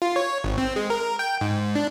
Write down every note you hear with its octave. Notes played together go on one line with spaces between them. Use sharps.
F4
C#5
G#1
C4
G#3
A#4
G5
G#2
D4